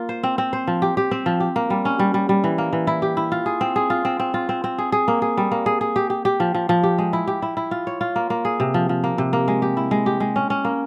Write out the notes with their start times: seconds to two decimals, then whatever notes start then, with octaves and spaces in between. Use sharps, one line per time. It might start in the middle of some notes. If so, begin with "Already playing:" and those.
Already playing: A#3 F4
0.09 C5
0.23 C4
0.38 C4
0.53 C5
0.67 F3
0.82 G4
0.97 G4
1.11 C4
1.26 F3
1.40 G4
1.56 A#3
1.70 G3
1.85 C#4
1.99 G3
2.14 G3
2.29 G3
2.44 E3
2.58 A#3
2.73 E3
2.87 E4
3.02 G4
3.17 E4
3.32 F4
3.46 G#4
3.61 C4
3.76 G#4
3.90 F4
4.05 C4
4.20 C4
4.34 F4
4.49 C4
4.64 C4
4.78 G#4
4.92 G#4
5.08 A#3
5.22 G#4
5.37 G3
5.52 A#3
5.66 G#4
5.81 G#4
5.96 G4
6.10 G4
6.25 G4
6.40 F3
6.55 F3
6.69 F3
6.83 G4
6.98 G#3
7.13 E4
7.27 G4
7.42 E4
7.57 E4
7.71 F4
7.87 C#5
8.01 F4
8.16 A#3
8.30 A#3
8.45 G#4
8.60 C3
8.74 F3
8.89 F3
9.04 A#3
9.18 C3
9.33 A#3
9.48 G#3
9.62 G4
9.77 E4
9.91 G#3
10.06 G4
10.20 G#3
10.36 C#4
10.50 C#4
10.65 A#3